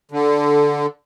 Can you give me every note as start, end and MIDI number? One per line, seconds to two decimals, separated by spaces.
0.11 0.86 50